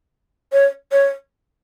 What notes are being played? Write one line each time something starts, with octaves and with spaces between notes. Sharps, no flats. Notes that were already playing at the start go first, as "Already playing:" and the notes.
C#5
C#5